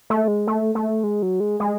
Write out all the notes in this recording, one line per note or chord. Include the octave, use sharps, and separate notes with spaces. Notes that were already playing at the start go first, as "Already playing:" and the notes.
A3
G#3
A3
A3
G#3
F#3
G#3
G#3